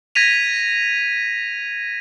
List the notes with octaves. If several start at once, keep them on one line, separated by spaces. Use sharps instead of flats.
G#6 A#6 B6 D#7 F7